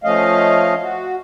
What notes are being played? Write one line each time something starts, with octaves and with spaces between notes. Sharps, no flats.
F3 A3 C#4 D#5 F5
F#4